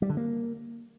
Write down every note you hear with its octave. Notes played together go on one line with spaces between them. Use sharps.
G3
D3
A#3